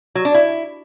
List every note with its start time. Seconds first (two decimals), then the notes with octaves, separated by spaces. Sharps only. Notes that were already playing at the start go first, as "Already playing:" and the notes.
0.15 F#3
0.25 D4
0.35 E4